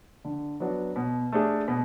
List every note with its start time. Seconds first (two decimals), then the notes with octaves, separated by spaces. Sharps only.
0.25 D3
0.60 F#3 B3 D4 F#4
0.96 B2
1.32 A3 D4 G#4
1.68 B2